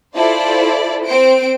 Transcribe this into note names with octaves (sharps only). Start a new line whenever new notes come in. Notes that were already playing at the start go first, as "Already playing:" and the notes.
E4 F4 A4 C5 D5
C4 C5 D7